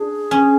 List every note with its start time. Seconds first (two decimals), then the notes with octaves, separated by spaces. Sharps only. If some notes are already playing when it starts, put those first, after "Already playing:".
Already playing: D4 G#4
0.31 C#4